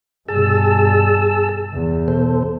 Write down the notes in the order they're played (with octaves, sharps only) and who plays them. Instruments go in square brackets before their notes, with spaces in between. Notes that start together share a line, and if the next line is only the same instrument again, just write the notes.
[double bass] G2 B2 [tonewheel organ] G#4 A5 E6
[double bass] E2
[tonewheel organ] B2 A4 C5